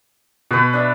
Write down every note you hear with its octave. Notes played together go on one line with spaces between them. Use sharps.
B2 B4 F#5
D4 E5